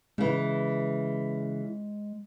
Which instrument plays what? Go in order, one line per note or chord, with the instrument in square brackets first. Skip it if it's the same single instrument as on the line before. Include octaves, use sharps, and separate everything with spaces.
[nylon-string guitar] C#3 E3 [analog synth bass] G#3